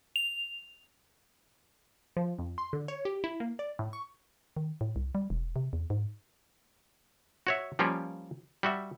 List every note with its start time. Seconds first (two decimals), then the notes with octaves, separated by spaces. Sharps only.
0.16 F7
2.17 F3
2.39 F2
2.58 C6
2.73 D3
2.88 C#5
3.05 G4
3.24 E4
3.40 A#3
3.59 D5
3.79 A2
3.93 C#6
4.57 D#3
4.81 A2
4.96 C2
5.15 G3
5.30 E1
5.56 C3
5.73 E2
5.90 G#2
7.47 F#4 C#5 E5
7.79 F3 G3 A#3 C#4 F4 G4
8.63 G3 F#4 E5